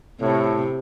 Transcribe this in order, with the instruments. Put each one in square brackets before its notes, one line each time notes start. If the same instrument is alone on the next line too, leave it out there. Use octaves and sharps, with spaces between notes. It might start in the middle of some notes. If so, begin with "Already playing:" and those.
[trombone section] A2 [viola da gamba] C3